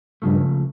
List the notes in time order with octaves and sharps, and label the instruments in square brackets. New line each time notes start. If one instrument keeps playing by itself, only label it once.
[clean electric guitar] C#2 C#3 F3 A3 [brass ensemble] G2